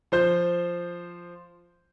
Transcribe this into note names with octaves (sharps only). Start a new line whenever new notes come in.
F3 C5 G6